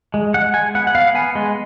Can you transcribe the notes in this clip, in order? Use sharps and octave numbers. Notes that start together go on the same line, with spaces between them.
G#3
G#3 F#5
G#3 G#5
B3 F#5
F#5
B3 F5
B3 G#5
G#3